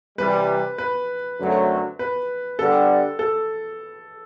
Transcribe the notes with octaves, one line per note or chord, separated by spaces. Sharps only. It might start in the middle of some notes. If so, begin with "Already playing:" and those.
C3 E3 G3 B4
B4
F#2 D3 F#3 A3 C4
B4
D3 G3 B3 D4 G4 A4
A4